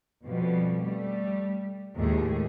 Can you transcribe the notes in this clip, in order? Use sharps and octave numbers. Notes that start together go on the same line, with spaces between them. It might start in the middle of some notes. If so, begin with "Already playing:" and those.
F2 B2 F3 G3
G3 A3
D#2 A2 F3 G#3 A3 G#4